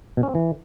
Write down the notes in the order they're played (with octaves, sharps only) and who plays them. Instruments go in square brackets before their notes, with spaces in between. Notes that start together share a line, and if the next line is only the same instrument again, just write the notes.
[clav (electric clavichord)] B2
C#4
C4
E3